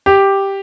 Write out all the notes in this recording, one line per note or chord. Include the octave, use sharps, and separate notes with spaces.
G4